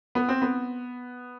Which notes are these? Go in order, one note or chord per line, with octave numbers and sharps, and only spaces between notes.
B3
C4
B3